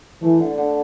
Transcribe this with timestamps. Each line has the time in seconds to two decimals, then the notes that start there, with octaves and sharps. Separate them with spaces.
0.22 E3 A3
0.40 D3
0.58 D3